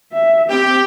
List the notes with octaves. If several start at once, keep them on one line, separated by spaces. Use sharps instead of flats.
E5
C4 G4